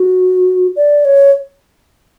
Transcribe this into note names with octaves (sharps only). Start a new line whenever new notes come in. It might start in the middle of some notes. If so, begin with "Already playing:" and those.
Already playing: F#4
D5
C#5